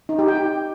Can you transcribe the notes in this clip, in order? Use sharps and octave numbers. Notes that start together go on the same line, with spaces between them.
D#4
G4
G5